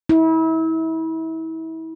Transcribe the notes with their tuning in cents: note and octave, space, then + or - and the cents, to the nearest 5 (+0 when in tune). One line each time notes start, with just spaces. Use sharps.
E4 -35